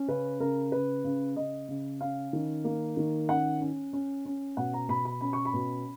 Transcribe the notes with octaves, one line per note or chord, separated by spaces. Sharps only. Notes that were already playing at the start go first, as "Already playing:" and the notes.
Already playing: C#4
C#3 B4
C#3 A#4
C#3 B4
C#3
C#3 D#5
C#3
C#4 F5
D#3
A#3
D#3
C#4 F#5
C#4
C#4
C#4
B2 F#5
A#5
B2 B5
B5
C#4 B5
C#6
B5
B2